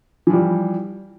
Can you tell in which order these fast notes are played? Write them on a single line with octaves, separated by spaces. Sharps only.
E3 F3 G3